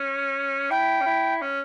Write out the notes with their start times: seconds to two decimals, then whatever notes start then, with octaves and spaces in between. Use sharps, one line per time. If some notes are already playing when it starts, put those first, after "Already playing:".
Already playing: C#4
0.71 E4 G5
1.01 C#4
1.06 E4
1.42 C#4